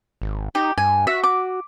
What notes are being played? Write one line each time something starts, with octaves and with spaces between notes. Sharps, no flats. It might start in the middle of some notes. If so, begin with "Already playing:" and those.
G#1
D#4 G4
G2 G#5
F#4 E5
D6